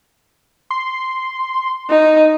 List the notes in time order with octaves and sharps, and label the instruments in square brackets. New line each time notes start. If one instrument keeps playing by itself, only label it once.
[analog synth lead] C6
[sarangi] D#4